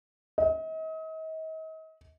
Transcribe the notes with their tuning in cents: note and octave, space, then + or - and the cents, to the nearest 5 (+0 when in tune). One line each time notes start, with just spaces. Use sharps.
D#5 +40